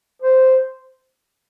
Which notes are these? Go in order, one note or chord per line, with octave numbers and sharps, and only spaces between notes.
C5